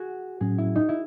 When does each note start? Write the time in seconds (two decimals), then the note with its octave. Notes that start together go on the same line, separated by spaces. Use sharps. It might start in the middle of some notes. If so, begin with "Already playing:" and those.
Already playing: F#4 G#4
0.41 A2 F#3 C#4 G#4
0.58 E4
0.76 D#4
0.89 E4